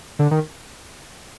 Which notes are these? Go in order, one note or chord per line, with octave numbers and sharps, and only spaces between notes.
D3
D#3